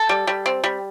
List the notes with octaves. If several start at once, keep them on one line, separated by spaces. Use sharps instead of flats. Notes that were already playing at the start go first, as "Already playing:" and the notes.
Already playing: A4
G3
G3
C4
G3